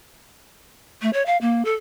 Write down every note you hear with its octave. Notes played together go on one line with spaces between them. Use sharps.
A3
C#5
F5
A#3
A4